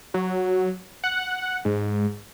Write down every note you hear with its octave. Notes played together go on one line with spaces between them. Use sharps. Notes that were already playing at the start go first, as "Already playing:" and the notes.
F#3
F#5
G#2